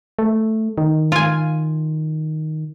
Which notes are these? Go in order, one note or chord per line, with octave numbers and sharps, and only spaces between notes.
A3
D#3
F4 G#5